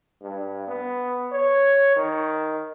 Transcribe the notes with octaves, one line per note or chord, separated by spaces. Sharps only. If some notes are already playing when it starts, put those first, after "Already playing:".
G2
B3
C#5
D#3